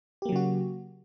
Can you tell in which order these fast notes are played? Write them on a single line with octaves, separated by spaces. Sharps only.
G4 A#3 F#3 C#3 F#4